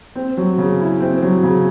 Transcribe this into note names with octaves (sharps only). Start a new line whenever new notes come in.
C4
F#3
C#3
E4
C4
F#3
C#3